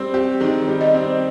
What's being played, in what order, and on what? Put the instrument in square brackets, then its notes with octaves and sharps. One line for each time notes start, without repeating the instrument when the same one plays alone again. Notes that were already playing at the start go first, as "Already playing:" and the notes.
Already playing: [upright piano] G3 C4
G4
[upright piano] D#3 [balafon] G#4
[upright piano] G3
[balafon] D#5
[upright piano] C4